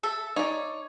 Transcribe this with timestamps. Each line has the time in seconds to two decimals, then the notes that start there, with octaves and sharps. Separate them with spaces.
0.03 A4 E5
0.36 D#4 C#5 D5